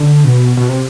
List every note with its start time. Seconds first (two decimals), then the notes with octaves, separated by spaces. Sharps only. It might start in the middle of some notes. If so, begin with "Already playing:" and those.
Already playing: D3
0.24 B2
0.57 B2
0.69 C3